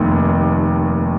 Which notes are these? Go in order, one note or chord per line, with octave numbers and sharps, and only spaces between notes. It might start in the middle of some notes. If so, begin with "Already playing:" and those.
Already playing: F1 D#2